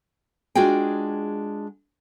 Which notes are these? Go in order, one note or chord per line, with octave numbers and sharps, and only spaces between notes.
G#3 D4 F4 F#4 G#4 G5